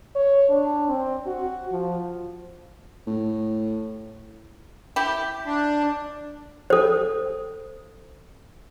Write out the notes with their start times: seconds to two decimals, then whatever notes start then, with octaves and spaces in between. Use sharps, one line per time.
0.15 C#5
0.49 D4
0.88 C4
1.27 F#4
1.71 F3
3.07 A2
4.96 E4 G4
5.46 D4
6.70 A4 C5